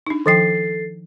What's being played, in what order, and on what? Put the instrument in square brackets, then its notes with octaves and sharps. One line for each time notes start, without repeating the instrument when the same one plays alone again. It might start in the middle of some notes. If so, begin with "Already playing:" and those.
[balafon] D4 D#4
[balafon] D#3 F3 G5 [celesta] A4 A6 C7